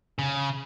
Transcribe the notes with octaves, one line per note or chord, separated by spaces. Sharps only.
C#3